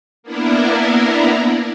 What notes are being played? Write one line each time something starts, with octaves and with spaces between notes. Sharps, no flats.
A#3 B3 D4 E4 A#4